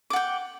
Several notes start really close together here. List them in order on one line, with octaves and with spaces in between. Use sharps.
D6 F#5 G5